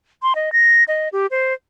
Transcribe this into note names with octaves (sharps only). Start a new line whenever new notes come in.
C6
D#5
A#6
D#5
G4
C5